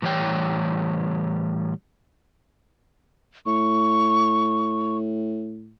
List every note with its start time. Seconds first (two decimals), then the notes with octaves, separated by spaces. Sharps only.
0.02 A2 E3 G3 C#5 G5
3.46 A2 C#6